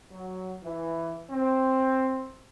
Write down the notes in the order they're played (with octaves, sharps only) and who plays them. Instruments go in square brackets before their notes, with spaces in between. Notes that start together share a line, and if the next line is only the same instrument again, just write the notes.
[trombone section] F#3
E3
C4